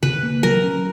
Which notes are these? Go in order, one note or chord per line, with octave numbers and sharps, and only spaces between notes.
C#3 B4
A#3
F#3 A#4
C#4